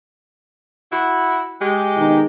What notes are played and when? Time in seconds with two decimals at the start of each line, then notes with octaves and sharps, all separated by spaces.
0.92 E4 F#4
1.61 G#3 G4
1.97 B2 D#3 D#4